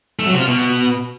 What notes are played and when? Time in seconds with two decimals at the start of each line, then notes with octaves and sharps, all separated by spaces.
0.19 A3
0.26 F#3
0.33 C3
0.40 F4
0.47 B2